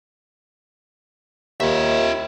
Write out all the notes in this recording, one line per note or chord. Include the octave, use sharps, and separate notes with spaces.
D#2 F4 E5